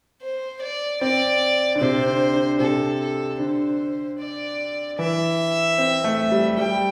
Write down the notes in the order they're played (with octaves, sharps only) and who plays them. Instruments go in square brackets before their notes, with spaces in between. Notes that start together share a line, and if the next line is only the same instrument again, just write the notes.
[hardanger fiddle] C5
D5
[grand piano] C4 [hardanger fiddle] D5
[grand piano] D3
[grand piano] C3 [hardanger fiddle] C5
[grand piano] D3
D3
[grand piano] C3 [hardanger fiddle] A4
[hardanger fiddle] A4
[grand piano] D3 [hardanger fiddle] C5
[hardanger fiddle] D5
[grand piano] E3 [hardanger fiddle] E5
[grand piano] C4
A3
G3
[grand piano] G3 [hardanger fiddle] G5